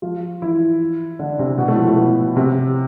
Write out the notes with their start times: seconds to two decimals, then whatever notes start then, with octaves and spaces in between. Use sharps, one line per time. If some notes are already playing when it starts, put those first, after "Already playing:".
0.02 F3 F4
0.42 E3 E4
1.19 D3 D4
1.39 C3 C4
1.58 B2 B3
1.68 A2 A3
1.78 F3
1.87 A2 A3
1.97 B2 B3
2.36 C3 C4